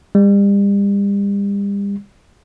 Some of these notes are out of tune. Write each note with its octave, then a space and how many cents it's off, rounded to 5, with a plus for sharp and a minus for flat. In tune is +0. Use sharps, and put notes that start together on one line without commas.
G3 +40